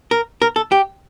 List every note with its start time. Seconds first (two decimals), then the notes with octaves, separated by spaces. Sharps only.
0.11 A#4
0.42 A#4
0.56 A4
0.72 G4